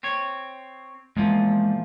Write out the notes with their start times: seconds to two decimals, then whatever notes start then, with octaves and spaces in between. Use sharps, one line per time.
0.03 C4 C#5
1.17 E2 A#2 F3 G#3